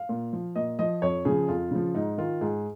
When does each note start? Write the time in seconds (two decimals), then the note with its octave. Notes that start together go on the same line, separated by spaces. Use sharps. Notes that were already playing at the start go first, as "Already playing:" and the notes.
Already playing: F5
0.09 A#2
0.33 F3
0.56 A#2 D#5
0.79 F3 D#5
1.02 F2 C#5
1.25 C#3 F3 G#4
1.48 F2 F4
1.71 C#3 F3
1.95 G#2 D#4
2.18 D#3 F4
2.41 G#2 G#4